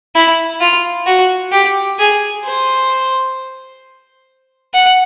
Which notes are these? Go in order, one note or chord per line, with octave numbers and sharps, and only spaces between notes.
E4
F4
F#4
G4
G#4
C5
F#5